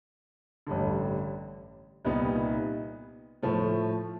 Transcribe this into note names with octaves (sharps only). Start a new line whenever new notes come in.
A1 G2 D3
C2 A#2 G3 B3 D#4
A2 F3 A3